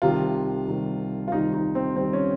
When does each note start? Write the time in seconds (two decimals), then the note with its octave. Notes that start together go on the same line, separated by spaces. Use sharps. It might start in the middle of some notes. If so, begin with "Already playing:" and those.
0.02 C2 C3 D#3 F4
0.67 C2 C3 D#3
1.28 F4
1.32 C2 C3 D#3 D#4
1.53 D#4
1.75 C4
1.96 C2 C3 D#3 C4
2.13 C#4